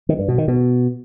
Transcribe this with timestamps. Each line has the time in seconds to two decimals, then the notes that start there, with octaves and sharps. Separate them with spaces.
0.09 D#3
0.19 G2
0.28 B2
0.38 D#3
0.48 B2